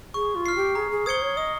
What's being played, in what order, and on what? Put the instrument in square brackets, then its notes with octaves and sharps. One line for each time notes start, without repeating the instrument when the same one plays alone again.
[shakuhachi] G#4 [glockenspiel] C#6
[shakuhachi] F4
[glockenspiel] F6 C7
[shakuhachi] G4
[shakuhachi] G#4 [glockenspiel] A#5
[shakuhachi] G#4
[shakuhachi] C5 [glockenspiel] D#6 G#6 C#7 G7
[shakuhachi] C#5
[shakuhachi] D#5 [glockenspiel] D#6